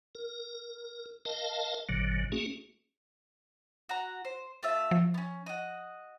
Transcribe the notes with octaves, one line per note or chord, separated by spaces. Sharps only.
A#4
A#4 D#5 F5 A5
G#1 A#2 D3 F#3
A3 A#3 C#4 F#4 G#4
F#4 A#5
C5
A3 F4 E5
F3
B3 C#4
F#4 D#5